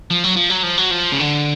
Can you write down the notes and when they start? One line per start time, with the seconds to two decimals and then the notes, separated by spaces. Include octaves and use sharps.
0.11 F3
0.24 F#3
0.36 F3
0.50 F#3
0.63 F3
0.78 F#3
0.91 F3
1.12 C#3
1.20 D3